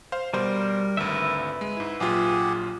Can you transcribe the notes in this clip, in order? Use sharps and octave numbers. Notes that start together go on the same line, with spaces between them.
C5 F5
B2 G3 A#4 C5
G#1 D2 B4 E5
G#3
G#2 E4
A#1 F#3 F4 G4 G#4 F#5